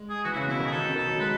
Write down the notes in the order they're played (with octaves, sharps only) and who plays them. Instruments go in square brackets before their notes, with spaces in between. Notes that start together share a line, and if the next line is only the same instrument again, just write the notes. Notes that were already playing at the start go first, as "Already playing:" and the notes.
Already playing: [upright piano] G#3
[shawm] G#4
[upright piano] E3 [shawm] F#4
[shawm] E4
[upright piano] C#3 [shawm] F#4
[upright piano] B2 [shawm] E4
[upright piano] D#3
[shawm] G#4
[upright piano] D#3 [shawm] A4
[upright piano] B2
[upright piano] D#3 [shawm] A4
[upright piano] F#3
[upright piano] G#3 [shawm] B4